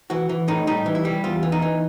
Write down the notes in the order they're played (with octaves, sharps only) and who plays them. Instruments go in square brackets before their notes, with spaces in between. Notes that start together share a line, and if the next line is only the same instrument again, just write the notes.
[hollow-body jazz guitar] E3 F#4
E3
A2 D#4
G3 D#4
E3
E4
G3
E2 F4
E3
D#4
E3